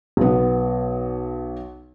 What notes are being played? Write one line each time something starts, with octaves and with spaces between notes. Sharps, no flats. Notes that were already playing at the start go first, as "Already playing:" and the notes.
B1 B3